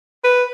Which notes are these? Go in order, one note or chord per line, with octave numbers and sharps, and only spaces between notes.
B4